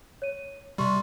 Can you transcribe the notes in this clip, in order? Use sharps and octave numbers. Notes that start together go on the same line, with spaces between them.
C#5 D#7
C3 G3 G4 C6 C#6